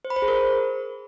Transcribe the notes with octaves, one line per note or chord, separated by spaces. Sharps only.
C5
B5
C5
G#4
A#4